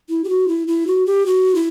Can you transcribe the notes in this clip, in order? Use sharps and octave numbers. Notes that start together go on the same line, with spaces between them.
E4
G4
F#4
E4
E4
F#4
G4
F#4
E4